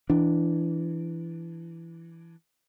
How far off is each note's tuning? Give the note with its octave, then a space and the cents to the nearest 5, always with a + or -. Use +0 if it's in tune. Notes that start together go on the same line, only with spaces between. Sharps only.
E3 +15 D4 +0